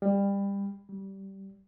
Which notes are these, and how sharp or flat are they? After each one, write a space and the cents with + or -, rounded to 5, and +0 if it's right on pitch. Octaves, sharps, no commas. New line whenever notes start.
G3 +25
G3 -15